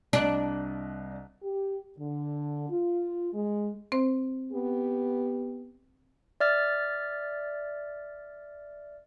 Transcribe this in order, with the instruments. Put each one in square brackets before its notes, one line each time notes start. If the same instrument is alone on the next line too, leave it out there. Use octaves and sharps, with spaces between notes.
[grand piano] C2 D#5 F#6 [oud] D4
[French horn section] G4
D3
F4
G#3
[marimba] C4 C5
[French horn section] B3 G4
[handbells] D5 E5 F6 A6